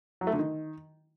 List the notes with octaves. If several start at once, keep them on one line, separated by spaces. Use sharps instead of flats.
F#3
A3
D3
D#3